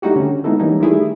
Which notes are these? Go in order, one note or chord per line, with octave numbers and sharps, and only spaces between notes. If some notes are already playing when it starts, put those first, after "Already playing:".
G3 A3 D#4 E4 F#4 G4
D3 C#4
G#3 B3 D#4 E4 A4
E3 G3 A#3 C#4 D#4
D#3 G3 A3 E4 G#4